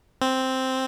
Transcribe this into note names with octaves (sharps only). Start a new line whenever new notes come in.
C4